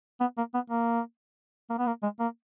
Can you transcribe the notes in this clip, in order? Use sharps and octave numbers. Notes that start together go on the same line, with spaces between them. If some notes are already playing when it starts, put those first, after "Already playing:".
B3
A#3
B3
A#3
A#3
B3
A#3
G#3
A#3